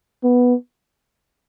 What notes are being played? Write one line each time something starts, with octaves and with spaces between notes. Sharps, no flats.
B3